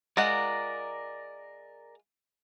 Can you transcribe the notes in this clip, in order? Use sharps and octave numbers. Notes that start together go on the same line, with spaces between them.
G#3 F4 A#4 D5 F#5 A#5